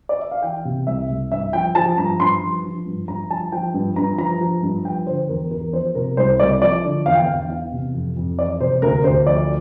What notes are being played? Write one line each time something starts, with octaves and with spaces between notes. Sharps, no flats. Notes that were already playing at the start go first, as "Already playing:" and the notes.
D5
E5
F5
E3 G5
C3
C2 E5
C2
G2 E5
F3 G5
F3 A5
G2 A#5
G2 C6
F3
F3
G2
G2 A#5
F3 A5
F3 G5
G2
G2 A#5
F3 A#5
F3
G2
F3 G5
D3 C5
E2 A#4
E2 A#4
F3 C5
C3 A#4
C2 C5
C2 D5
F3 D5
D3
E2 F5
G5
F5
E2
E3 F5
C3
F2
F2
E3 D5
C3 C5
D2 A#4
D2 C5
F3 D5